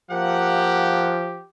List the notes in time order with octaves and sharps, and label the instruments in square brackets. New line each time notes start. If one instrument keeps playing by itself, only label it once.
[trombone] F3 [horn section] A#3 F#5 [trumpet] G4